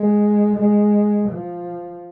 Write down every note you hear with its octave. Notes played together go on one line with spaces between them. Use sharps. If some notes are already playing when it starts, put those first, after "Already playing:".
Already playing: G#3
G#3
F3